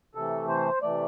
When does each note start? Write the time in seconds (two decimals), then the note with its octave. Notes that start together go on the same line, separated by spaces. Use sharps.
0.15 C3 E3 A3 A4
0.48 C5
0.82 C3 E3 A3 D5